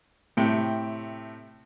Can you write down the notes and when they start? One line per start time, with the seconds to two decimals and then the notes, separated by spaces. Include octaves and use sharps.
0.37 A2 C3 G5